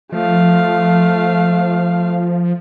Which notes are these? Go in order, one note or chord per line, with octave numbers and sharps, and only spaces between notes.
F3 A3 F5